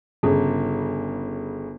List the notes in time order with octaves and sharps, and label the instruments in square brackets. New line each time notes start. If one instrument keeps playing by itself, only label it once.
[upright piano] G1 C#3